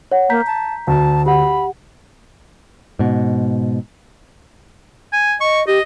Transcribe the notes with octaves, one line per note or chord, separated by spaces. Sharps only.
C#5 F#5
A#3 A#5 G6 B6
A5
D2 A5
G4 F#5 B5
G#2 B2
G#5
D#5 C#6
G4 D#5